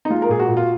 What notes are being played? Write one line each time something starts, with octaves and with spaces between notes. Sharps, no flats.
D#4
G#3 F4
A#4
A#2 G#4
F#4
A#2
F4